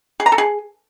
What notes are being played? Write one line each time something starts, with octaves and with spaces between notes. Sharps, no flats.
G#4
A#5
A4
G#4